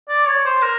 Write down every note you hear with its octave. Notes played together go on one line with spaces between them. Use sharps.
D5
C#5
C5
A#4